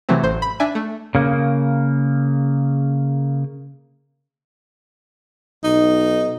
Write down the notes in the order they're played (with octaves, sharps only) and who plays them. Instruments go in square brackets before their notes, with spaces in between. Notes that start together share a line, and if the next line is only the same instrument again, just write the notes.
[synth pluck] C3 E3 F#3 A3 C4
A1 C5
B5
D4 E5 G#5
A3
[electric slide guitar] C#3 A#3
[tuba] B1 [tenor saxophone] D#4